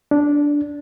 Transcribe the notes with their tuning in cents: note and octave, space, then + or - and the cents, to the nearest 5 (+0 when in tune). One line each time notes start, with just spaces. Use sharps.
D4 -10